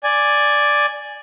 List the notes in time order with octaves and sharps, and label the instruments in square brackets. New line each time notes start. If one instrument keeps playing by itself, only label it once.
[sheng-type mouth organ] D5 G#5